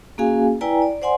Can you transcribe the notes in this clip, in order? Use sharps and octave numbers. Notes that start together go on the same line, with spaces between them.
A#3 C#4 F#4 G#4 F5 G#5
E4 B4 D5 G5 G#5 A#5
D5
C5 D5 F#5 G#5 C6